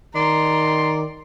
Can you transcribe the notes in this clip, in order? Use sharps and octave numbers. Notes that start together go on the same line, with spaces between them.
D#3 D5 A#5 C6